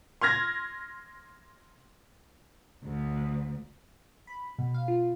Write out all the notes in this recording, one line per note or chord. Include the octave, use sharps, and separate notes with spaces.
C6 F6 G#6 A#6
D2
B5
B2
F5
F4